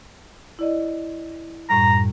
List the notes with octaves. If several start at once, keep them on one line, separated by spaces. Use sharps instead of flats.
E4 D5 D#5
F#2 A2 G3 A#5